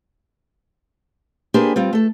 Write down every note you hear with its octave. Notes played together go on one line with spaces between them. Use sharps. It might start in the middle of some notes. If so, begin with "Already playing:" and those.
A#3 D4 G4 G#4 B4 C5
G3 C4 F4
A3 A4